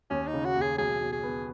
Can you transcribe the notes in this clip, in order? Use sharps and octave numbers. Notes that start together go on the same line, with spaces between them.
D#2 C#4
D#4
C#3
F#4
D#2
G#4
B1 G#4
B2
G#4
B3